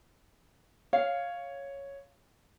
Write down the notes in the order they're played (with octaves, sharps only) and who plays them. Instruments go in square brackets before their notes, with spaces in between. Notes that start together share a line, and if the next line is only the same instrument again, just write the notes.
[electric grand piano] C#5 [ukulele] F5